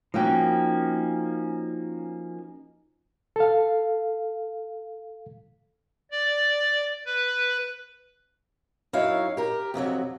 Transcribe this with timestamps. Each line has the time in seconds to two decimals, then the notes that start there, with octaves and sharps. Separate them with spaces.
0.14 F3 A#3 C#4 D#4 F#4 G5
3.36 A4 F5
6.11 D5
7.06 B4
8.93 F#2 D#4 E4 C#5 F5
9.37 G4 A#4
9.74 F2 C3 D#3 F#3